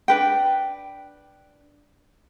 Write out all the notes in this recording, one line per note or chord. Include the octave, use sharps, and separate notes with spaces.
D4 B4 G5